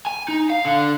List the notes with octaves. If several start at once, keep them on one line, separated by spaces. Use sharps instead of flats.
G#5
D#4
F5
D3